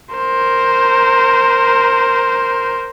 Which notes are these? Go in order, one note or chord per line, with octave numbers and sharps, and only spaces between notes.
A#4 C5